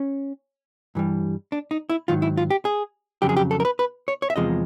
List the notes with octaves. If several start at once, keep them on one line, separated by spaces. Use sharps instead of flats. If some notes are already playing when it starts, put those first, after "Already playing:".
Already playing: C#4
G2 E3 G3
D4
D#4
E4
G#2 D#3 F#3 F4
E4
F4
G4
G#4
F2 C#3 F#3 G4
G#4
G4
A4
A#4
B4
B4
C#5
C#5
E5
E2 C3 F3 G#3 D#5